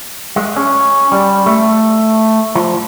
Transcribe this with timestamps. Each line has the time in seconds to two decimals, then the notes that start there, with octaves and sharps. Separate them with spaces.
0.36 G#3
0.56 C#4
1.12 G3
1.46 A3
2.55 F3